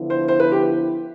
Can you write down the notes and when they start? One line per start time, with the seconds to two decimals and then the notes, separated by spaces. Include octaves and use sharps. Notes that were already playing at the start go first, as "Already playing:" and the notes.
Already playing: D3 F3 B3 E4
0.10 C5
0.28 C5
0.40 B4
0.52 G4